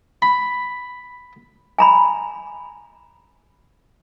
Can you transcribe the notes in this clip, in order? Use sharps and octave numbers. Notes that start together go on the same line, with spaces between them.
B5
G#5 A#5 B5